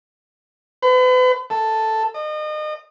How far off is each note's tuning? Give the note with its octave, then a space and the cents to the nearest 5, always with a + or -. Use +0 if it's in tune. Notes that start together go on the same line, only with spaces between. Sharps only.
B4 +40
A4 +0
D#5 -35